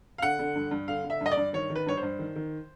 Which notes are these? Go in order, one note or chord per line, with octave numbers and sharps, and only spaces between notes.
F5
D3 F#5
D3
G2
G2
D3 F5
D3
E5
G2
D#5
D5
G2
D#3 C#5
D#3
B4
G2 C#5
C5
G2
D#3
D#3